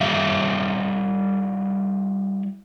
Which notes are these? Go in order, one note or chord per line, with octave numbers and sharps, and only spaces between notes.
G3 E4 F#4 G#4 E5 F5